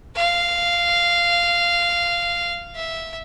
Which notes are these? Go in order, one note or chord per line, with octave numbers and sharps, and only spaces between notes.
F5
E5